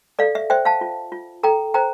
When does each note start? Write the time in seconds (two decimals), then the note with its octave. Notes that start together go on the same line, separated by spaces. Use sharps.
0.19 A4 D5 F5
0.35 E5
0.50 C5 E5 G5
0.65 F5 A5
0.81 F4
1.12 F4
1.43 A4 G5 A#5
1.74 C5 G5 A#5